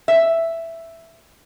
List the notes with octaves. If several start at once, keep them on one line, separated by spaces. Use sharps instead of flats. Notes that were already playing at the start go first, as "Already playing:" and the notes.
E5